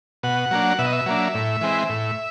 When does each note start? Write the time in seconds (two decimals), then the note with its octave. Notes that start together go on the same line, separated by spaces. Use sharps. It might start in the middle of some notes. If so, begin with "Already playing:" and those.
0.23 B2 F#5
0.51 F#3 A#3 D4
0.79 B2 E5
0.86 D#5
0.93 E5
1.06 F#3 A#3 D4
1.34 A2
1.61 E3 G#3 C4
1.89 A2